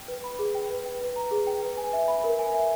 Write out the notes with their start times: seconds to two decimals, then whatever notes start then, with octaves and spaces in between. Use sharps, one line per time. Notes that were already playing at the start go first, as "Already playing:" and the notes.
Already playing: G5
0.08 B4
0.24 B5
0.39 G#4
0.55 G5
0.70 B4
0.86 G5
1.01 B4
1.16 A#5
1.31 G#4
1.47 G5
1.62 B4
1.77 G#5
1.93 E5
2.08 B5
2.24 A#4
2.39 G#5
2.54 E5